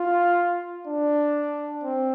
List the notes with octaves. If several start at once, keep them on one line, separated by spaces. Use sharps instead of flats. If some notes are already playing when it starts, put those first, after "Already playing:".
Already playing: F4
D4
C4